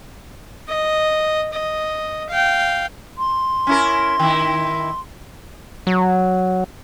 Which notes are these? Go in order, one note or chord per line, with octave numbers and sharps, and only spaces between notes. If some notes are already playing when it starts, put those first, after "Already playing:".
D#5
D#5
F5 G5
C6
C#4 E4 A#4
D#3 E4
F#3